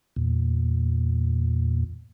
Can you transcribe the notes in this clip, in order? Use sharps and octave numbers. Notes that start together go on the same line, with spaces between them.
E2 A#2